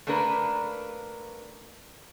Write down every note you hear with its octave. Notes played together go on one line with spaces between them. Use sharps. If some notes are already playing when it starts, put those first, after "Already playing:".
A3 A#3 D4 A#4 B4